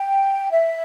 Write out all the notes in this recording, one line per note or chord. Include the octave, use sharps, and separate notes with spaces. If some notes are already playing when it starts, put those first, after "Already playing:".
Already playing: G5
E5